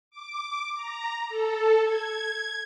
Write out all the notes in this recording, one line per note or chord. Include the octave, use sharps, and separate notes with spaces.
D6
A#5
A4
G#6